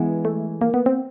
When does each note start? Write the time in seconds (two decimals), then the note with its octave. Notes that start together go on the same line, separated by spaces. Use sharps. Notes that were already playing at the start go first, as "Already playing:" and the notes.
Already playing: E3 G#3 B3 E4
0.25 A3
0.61 A#3
0.74 B3
0.86 C4